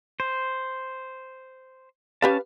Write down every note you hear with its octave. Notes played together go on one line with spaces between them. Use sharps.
C5
C#4 G4 B4 F5 A5